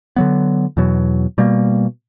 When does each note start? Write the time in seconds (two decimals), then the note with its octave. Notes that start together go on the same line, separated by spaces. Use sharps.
0.16 D3 F#3 B3
0.77 E2 B2 F#3
1.38 B2 G3 A#3